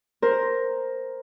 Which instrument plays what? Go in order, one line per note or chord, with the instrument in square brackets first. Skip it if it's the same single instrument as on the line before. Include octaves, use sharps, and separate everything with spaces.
[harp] A#4 C5